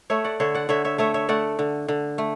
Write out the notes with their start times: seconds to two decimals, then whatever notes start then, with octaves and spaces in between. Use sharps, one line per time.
0.10 A3 C#5 E5
0.24 D5 F#5
0.40 D3 C#5 E5
0.54 D5 F#5
0.69 D3 C#5 E5
0.85 C#5 E5
0.98 A3 C#5 E5
1.14 C#5 E5
1.29 A3 D5 F#5
1.59 D3
1.88 D3
2.18 A3